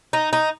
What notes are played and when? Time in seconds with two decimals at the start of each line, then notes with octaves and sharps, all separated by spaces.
0.13 D#4
0.33 D#4